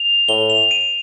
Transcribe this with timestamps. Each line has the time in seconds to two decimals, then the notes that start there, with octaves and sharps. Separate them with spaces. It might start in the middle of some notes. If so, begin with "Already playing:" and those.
Already playing: F7
0.28 A2 G7
0.50 F7
0.71 D#7